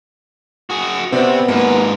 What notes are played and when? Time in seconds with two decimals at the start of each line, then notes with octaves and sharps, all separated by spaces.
0.70 F#4 G#4
1.12 C3 B3 C4 F#4 D5
1.48 G#2 A#3 B4